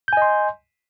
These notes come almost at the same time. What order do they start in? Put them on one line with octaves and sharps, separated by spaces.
G6 G#5 D#5 C6